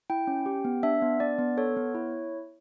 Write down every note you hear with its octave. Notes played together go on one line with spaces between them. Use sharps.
E4 G5
C#4
G4
B3
D4 E5
B3
D4 D5
B3
A4 C#5
B3
E4